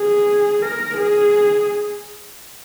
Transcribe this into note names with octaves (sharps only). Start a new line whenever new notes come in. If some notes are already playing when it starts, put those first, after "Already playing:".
Already playing: G#4
A#4
G#4